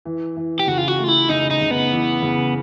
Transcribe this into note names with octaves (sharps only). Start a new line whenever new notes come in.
E3
E3
G4
C#3 F#4
F4
F#4
A3
F4
E4
C#3 D#4
D#4
C#3
B3
E3
C#3